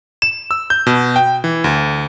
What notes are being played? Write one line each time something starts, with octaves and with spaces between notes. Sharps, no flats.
E7
E6
G6
B2
G5
E3
D2